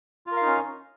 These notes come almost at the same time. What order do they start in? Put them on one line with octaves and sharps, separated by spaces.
F4 A#4 F5 D#4 C#4